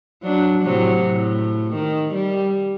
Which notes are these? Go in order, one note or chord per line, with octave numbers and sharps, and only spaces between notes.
F#3 D4
A2 C3 F#3
A2
D#3
G3